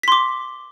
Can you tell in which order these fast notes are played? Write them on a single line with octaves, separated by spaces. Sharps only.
B6 C6 D6